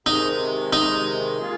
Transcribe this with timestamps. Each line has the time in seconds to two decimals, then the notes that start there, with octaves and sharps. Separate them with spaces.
0.06 C3 D#3 G#3 D#4
0.73 D#4
1.40 A#3 F4 G#4